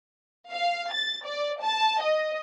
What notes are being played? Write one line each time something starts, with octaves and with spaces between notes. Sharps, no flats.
F5
A6
D5
A5
D#5